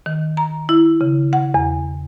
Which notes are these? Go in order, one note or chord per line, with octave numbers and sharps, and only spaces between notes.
D#3
A#5
E4
C#3
F#5
E2